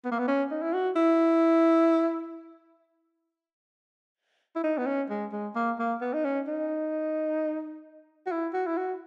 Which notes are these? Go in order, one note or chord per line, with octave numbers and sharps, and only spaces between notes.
B3
A#3
B3
C#4
D#4
E4
F#4
E4
E4
D#4
B3
C#4
G#3
G#3
A#3
A#3
B3
D#4
C#4
D#4
F#4
E4
F#4
E4
F#4